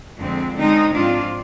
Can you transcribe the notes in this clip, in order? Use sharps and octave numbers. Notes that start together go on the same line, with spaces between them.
F2 D3 G#3 C4
D3 G#3 C4 D#4
G#2 F3 C4 D4 F4